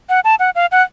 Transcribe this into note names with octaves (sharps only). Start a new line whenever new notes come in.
F#5
A5
F#5
F5
F#5